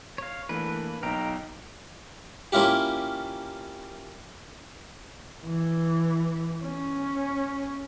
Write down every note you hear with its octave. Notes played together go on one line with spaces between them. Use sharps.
C#5 F5
E3 A3 A#3 D4 B4
B1 D#4 G5 A#5 F6
A#3 C#4 E4 F4 G4
E3
C#4